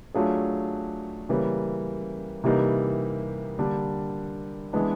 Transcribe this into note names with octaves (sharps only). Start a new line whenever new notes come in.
F#3 A3 D4 F4 G#4
C#3 E3 G3 A#3
C3 E3 G3 A#3 D#4
D3 G3 A#3 D4
E3 G#3 B3 D4